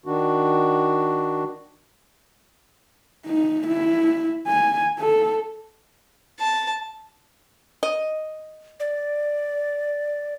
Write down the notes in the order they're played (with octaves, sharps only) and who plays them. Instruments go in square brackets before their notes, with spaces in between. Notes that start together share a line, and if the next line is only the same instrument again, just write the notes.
[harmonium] D#3 D4 F#4
[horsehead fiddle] D#4
E4
G#5
A4
[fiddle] A5
[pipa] D#5
[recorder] D5